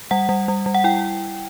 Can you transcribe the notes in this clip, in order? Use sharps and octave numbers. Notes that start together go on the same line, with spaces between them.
G3 F#5
G3
G3
G3
F#5
E4 G5